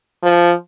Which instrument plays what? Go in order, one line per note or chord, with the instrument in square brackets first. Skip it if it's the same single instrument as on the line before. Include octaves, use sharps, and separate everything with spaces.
[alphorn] F3